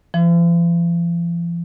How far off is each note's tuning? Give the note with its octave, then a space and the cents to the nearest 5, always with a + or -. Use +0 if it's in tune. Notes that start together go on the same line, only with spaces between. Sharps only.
F3 -45